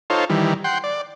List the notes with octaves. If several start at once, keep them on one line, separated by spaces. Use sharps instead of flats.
D#4 F4 A4 C5 C#5
D#3 E3 G3
F#5 G5 C6
D5